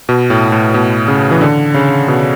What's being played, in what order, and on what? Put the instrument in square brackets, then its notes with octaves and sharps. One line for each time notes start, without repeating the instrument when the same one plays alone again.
[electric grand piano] B2
A2
A2
B2
C#3
E3
D3
C#3
B2